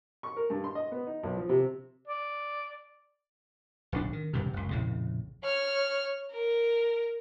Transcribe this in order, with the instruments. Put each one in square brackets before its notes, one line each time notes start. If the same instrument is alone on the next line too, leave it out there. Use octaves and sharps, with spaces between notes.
[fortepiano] C#6
A#4
G2
C6
D#5
B3
D#4
B1
F3
C3
[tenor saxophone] D5
[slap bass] D1 B1 D4
D#3
E1 G2 C3
F#1 C#2
A#1 F2 A2 C#3
[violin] C#5 F6
A#4